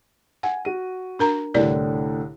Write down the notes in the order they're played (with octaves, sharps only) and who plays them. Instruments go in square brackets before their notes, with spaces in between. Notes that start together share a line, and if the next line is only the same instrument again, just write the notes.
[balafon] F#5 [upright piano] G#5
[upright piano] F#4 D#7
[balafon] D4 A#4 A#5
[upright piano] C2 A2 D3 [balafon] A#4 D5